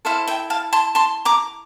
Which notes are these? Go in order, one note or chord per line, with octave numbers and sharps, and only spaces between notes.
E4 A4 C5 F5
E5 G5
F5 A5
A5 C6
A5 C6
A#5 D6